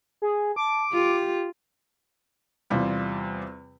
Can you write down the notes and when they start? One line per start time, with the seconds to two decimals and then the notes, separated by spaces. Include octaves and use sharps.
0.22 G#4
0.56 A5 D6
0.93 F4 G4
2.70 E2 C3 G3 F4